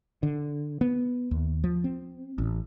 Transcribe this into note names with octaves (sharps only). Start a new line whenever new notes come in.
D3
B3
D#2
F3
C4
A1